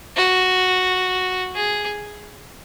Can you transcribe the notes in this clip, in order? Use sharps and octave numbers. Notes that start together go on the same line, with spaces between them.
F#4
G#4